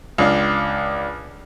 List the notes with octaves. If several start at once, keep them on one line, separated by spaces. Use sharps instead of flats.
C#2 D4 F5